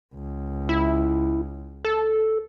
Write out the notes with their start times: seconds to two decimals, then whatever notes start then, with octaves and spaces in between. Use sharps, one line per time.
0.14 C#2
0.69 E4
1.85 A4